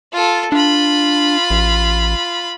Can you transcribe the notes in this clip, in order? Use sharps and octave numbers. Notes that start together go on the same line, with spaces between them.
F4 A4
D4 F4 B5
A1